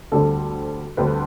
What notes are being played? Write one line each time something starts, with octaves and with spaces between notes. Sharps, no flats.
D2 D3 G3 C4 A4
D2 D3 G3 C4 B4